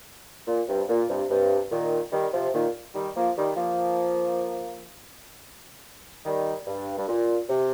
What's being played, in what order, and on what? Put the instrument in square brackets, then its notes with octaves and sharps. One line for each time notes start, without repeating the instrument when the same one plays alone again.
[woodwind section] A#2
G2 C3
A#2
G2 C3
G2 C3
A#2 D#3
D#3 G3
C3 F3
A#2 D#3
D#3 G3
F3 A#3
D#3 G3
F3 A#3
D#3 G3
G2
G2
A#2
C3